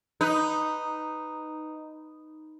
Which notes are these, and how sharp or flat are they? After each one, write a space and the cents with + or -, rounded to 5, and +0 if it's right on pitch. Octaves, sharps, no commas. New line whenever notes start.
D#4 -5 B4 +5